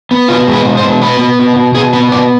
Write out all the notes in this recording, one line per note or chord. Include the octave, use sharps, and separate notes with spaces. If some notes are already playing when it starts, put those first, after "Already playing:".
B3
B2 F4
G#3
B4
G#3
C5
B2
B3 B4
B3
B2
B2
B2 G#4
B3 B4
B2 D5